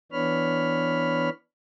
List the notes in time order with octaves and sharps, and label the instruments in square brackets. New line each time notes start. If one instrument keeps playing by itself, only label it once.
[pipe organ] E3 B3 D4 C#5 B5 F6